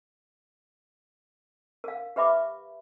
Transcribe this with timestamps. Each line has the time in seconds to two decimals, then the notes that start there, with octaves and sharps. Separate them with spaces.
1.84 A#4 F5
2.16 G4 B4 E5 B5 D6